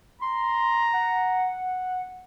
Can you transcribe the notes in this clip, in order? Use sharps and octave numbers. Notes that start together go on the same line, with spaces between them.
A#5 C6
F#5